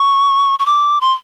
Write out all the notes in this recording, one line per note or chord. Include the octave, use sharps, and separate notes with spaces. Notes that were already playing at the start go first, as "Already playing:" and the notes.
Already playing: C#6
C#6
D6
C6